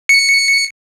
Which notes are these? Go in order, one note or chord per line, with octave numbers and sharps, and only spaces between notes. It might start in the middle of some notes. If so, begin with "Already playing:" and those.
C#7